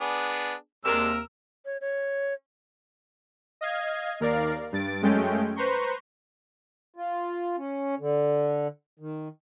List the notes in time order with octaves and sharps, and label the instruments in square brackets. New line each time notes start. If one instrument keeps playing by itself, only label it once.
[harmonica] B3 D4 G#4
[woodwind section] D#2 E6 [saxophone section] C3 A#4 [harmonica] G#3 D4
[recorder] C#5
C#5
[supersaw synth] D#5 F5 G#6
D#2 A#4 D5 F5
G2 A6 D7
F#2 G#3 A3 C#4 G5
B4 C5 A#5 C6 C#6
[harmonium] F4
C#4
D3
D#3